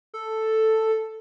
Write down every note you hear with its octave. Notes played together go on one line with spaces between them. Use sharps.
A4